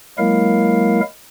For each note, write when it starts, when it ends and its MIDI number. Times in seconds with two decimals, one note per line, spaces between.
0.18 1.01 54
0.18 1.01 56
0.18 1.01 58
0.18 1.01 64
0.18 1.01 70
0.18 1.01 77